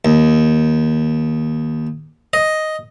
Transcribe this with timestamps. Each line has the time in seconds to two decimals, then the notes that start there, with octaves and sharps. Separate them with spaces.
0.05 D#2
2.33 D#5